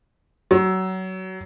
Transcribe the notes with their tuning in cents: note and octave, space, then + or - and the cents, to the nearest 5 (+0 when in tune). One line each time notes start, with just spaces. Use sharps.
F#3 +20